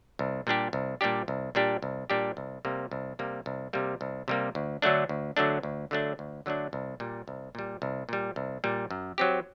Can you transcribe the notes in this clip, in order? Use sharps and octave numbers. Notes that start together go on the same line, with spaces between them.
C2
A#2 G3 D4 G4
C2
A#2 G3 D4 G4
C2
A#2 G3 D4 G4
C2
A#2 G3 D4 G4
C2
C3 G3 A#3
C2
C3 G3 A#3
C2
C3 G3 A#3
C2
C3 G3 A#3
D2
D3 F#3 A3 D4
D2
D3 F#3 A3 D4
D2
D3 F#3 A3 D4
D2
D3 F#3 A3 D4
C2
A#2 G3
C2
A#2 G3
C2
A#2 G3
C2
A#2 G3
F#2
F#3 C4 G4